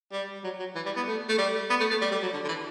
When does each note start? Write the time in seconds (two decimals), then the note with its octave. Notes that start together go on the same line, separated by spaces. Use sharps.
0.12 G3
0.44 F#3
0.60 F#3
0.75 E3
0.86 G3
0.96 B3
1.07 A3
1.29 A3
1.38 G3
1.70 B3
1.80 A3
1.91 A3
2.02 G3
2.12 G3
2.22 F#3
2.33 D3
2.44 D3
2.48 E3